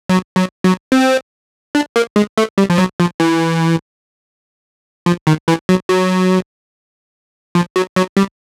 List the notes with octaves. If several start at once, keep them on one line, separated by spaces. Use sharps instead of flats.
F#3
F#3
F#3
C4
D4
A#3
G#3
A3
G3
F3
F#3
F3
E3
F3
D#3
E3
F#3
F#3
F3
F#3
F#3
G3